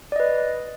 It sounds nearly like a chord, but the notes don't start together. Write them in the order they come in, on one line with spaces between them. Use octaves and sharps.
D5 D#5 B4